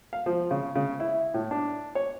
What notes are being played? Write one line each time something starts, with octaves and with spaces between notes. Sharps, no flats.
F5
F3
C#3
C#3
E4
A2
D4
C#5